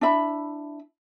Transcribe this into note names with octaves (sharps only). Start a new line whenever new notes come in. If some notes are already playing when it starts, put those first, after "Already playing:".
D4 E4 E5 B5